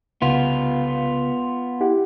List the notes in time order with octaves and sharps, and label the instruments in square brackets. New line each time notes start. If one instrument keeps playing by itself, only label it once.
[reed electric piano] C2 C#3 [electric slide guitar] B3 F4
[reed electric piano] E4 G4 F#5